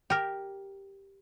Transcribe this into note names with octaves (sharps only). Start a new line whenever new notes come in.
G4 A#4